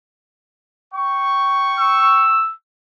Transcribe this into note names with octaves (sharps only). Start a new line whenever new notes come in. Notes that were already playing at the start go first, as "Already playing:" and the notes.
G5 C#6
E6